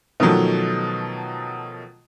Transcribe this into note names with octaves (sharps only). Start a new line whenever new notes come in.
B2 D#3 F3 F#3 A3